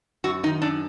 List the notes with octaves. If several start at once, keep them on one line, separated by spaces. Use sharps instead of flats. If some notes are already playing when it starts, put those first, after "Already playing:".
F#2 F#4
D#3 D#4
F#2 D4